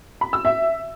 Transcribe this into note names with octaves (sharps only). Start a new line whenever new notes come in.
B5
E6
E5